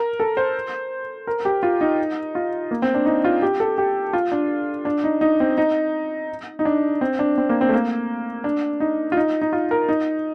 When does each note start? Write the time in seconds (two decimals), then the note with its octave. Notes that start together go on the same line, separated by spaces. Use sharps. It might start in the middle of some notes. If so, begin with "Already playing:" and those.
Already playing: A#4
0.20 A4
0.37 C5
1.27 A#4
1.45 G4
1.63 F4
1.81 D#4
2.35 F4
2.71 A#3
2.82 C4
2.94 D4
3.06 D#4
3.25 F4
3.42 G4
3.60 A4
3.78 G4
4.13 F4
4.32 D4
4.85 D4
5.04 D#4
5.21 D#4
5.40 C4
5.58 D#4
6.59 D#4
6.65 D4
7.01 C4
7.19 D4
7.38 C4
7.49 A#3
7.61 C4
7.69 A3
7.74 A#3
8.44 D4
8.80 D#4
9.12 F4
9.17 D#4
9.41 D#4
9.53 F4
9.71 A#4
9.88 D#4